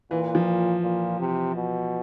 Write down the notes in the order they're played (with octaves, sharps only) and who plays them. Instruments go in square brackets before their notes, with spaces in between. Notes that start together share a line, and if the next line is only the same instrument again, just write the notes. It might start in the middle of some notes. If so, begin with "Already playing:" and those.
[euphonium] A#2 [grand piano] E3
[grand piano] F3
[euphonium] A#2
C3
B2